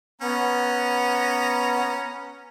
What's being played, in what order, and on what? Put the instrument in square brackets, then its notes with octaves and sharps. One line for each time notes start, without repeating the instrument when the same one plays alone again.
[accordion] B3 [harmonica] C#4 A#5